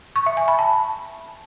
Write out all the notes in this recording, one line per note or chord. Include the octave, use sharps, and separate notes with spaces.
C#6
E5
G#5
B5
A5